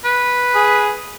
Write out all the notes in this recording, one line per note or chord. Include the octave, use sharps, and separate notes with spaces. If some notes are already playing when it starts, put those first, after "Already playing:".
B4
G#4